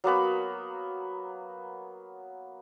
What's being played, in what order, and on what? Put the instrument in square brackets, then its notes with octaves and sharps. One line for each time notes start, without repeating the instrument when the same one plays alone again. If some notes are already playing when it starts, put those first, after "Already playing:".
[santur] F#3 A#3 B3 B5